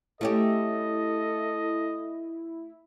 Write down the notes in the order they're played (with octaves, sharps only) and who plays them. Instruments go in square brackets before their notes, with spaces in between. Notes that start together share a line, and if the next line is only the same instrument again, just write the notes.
[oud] A3 C#4 G4 [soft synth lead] E4 [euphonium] A4 [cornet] D#5